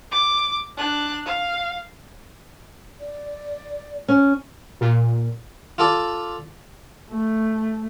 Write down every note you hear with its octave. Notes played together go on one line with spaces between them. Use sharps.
D6
D4 F#6
F5
D5
C#4
A#2
F4 A4 D5
A3